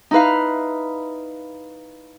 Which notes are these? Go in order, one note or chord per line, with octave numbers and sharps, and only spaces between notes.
D#4 E4 B4 F5